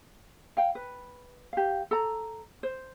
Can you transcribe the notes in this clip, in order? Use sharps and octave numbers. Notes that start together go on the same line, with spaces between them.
F5 G5
B4
G4 F5
A4 A#5
C5